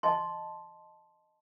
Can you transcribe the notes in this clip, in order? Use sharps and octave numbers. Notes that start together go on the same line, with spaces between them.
D#5 A5 C6